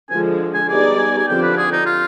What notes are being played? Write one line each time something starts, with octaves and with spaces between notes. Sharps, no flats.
D3 F3 G#3 G#5
G#5
G3 B3 D#4 G#4 D5 G#5
G#5
G#5
D3 F3 C4 G4 D5 G5
B4
G#4
D#4
F4